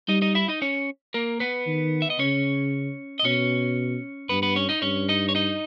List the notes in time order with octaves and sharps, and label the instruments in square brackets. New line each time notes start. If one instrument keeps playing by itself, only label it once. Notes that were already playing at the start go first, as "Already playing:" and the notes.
[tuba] G3 [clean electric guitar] D#4 D#5
[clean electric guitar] D#4 D#5
E4 E5
D#4 D#5
C#4 C#5
A#3 A#4
B3 B4
[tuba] D#3
[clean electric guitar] E5
D#5
[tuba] C#3 [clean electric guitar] C#4 C#5
[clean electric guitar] D#5
[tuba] B2 [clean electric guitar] C#4 C#5
[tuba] G2 [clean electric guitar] B3 B4
[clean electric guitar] B3 B4
C#4 C#5
D#4 D#5
[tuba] G2 [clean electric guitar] C#4 C#5
[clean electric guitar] D#4 D#5
C#5
D#4 D#5